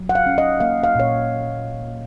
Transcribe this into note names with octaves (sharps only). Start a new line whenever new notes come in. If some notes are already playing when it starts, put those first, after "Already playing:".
Already playing: F#3
F#5
F5
C#4
D#5
A#3 F5
F5
A#2 C#5